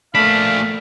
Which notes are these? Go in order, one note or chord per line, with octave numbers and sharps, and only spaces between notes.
A3 A#3 D4 F5 B5